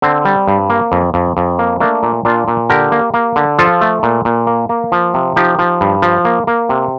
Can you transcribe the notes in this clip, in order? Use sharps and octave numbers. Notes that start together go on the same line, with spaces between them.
D3 C4
G3
G2
A#3
F2
F2
F2
A#3
A3 A#3 D4
A#2
A#2 D4 F4
A#2
D3 G4 A#4
A#3
A#3
D3
F3 F4 A4
A3
A#2
A#2
A#3
A#3
F3
C3
F3 D#4 G4
F3
G2
F3
A#3
A#3
C3